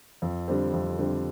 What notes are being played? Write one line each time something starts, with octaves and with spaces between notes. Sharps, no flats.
F2
D3 G3 C4
F2
D3 G3 C4